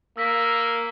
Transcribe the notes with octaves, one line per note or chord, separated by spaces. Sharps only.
A#3 E6 A#6 B6